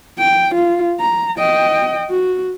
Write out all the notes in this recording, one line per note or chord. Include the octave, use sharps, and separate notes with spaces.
G5
F4
A#5
D#5 G5
F#4